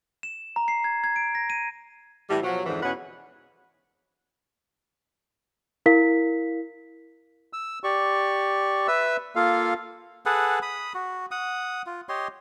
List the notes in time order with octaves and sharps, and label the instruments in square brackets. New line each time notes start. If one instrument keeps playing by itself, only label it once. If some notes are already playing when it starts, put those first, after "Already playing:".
[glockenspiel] E7
A#5
C7
G#6
G#6
D7
A#6
D#7
[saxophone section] A2 E3 G3
B2 F3 F#3
F2 G#2 D3 E3
E2 B2 C#4 B4 F#5
[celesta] E4 A#4 F5 B6
[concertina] E6
G4 D5 C#6
B4 E5 E6
A#3 F4 A4 F5
[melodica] G#4 A4 B4 F#5
B5 D#6
F#4
F#5 D#6
F4
G4 C#5 D#5 C6